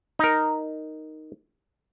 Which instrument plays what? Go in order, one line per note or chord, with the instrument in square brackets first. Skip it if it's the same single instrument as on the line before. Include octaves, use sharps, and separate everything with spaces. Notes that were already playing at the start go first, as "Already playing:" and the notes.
[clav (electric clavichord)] D#4 A#4